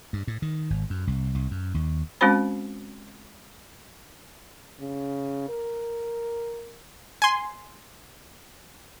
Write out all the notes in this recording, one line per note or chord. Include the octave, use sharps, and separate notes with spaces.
G2
A2
D#3
G#1
F#2
C2
C2
F#2
D#2
G#3 C4 C#4 F#4 C5 B5
C#3
A#4
G#5 C6